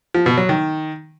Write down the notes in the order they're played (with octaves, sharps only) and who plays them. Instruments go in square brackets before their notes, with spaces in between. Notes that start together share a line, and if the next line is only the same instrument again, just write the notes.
[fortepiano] F3
B2
F#3
D#3